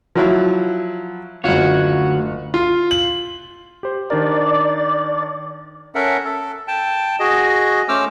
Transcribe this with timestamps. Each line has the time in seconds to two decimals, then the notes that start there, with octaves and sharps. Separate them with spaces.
0.15 F3 F#3 E4
1.44 F#1 D2 F4 F#4 C#5
2.54 F4
2.91 F#7
3.83 G4 C5
4.10 D#3 D4 A#4 D5
5.95 C#4 A4 A#4 E5 F#5
6.25 A4
6.68 G5 A5
7.20 F#4 G#4 D#5
7.88 A3 C#4 C5 D6 E6 F6